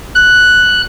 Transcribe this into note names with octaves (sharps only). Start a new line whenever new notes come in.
F#6